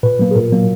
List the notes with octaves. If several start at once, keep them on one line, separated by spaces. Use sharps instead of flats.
A#2 B4
F#3 A#3
G#4
A#2 A#4
F#3 A#3